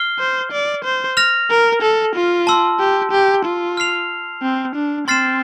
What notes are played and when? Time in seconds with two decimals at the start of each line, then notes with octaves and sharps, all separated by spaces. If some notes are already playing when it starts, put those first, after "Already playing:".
Already playing: F6 C7 G7
0.19 C5
0.52 D5
0.84 C5
1.17 F6 A#6 F7
1.50 A#4
1.82 A4
2.15 F4
2.47 A5 C6 E6
2.79 G4
3.12 G4
3.45 F4
3.77 F6 C7 F7
4.42 C4
4.76 D4
5.08 C4 C6 F6 A6 C7 E7